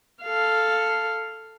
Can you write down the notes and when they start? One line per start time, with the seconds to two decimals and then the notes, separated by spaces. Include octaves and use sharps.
0.23 A4 F5